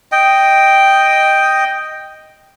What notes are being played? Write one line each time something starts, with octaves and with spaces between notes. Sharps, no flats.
D#5 G5